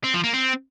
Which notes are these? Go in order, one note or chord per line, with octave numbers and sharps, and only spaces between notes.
C4
F3
A#3
C4